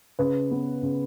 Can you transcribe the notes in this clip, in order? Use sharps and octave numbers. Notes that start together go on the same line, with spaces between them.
C#3 B4
B3
C#3